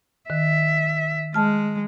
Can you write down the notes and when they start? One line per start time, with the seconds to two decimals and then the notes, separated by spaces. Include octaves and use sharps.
0.30 D#3 E5
1.34 G#3 A5 F6